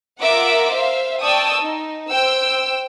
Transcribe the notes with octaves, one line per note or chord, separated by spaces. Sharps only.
F4 A#4 E5 F#5 A#5 D6
C5 E5 F5
D5 G5 A5 C#6 D#6 E6
D#4
C5 G5 E6